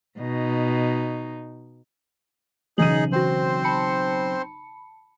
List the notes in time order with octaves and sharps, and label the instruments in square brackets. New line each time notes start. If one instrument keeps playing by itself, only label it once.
[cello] B2 D#4
[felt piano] B1 C#3 D#7 [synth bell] E3 F#7 [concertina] D#4 G#4
[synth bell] E3 F#4 [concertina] C4 C5
[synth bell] A5 B5 C#7